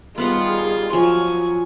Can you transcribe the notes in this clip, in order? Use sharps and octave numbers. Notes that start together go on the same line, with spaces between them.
D#3 G3 B3 F4 G#4 B4 F#5
F3 F#3 G#5 C#6